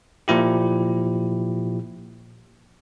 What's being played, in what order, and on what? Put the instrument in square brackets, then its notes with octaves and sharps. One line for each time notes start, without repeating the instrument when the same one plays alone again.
[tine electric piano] A#2 F3 E4 G4